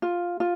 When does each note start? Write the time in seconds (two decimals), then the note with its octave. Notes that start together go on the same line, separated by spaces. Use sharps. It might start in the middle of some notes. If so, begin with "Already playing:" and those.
0.02 F4
0.40 F4